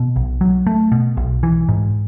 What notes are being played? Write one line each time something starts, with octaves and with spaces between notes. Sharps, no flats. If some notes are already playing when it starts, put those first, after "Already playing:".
Already playing: B2
B1
F#3
A3
B2
B1
E3
G#2